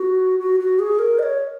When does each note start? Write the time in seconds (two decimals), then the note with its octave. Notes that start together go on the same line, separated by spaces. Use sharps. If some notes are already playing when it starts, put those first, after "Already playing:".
Already playing: F#4
0.40 F#4
0.60 F#4
0.79 G#4
0.99 A#4
1.19 D#5
1.23 C#5